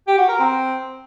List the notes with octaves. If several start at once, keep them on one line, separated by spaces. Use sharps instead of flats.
G4
F#4
A#4
C4